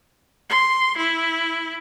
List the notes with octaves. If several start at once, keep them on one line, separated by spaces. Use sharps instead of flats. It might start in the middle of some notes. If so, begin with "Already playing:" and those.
C6
E4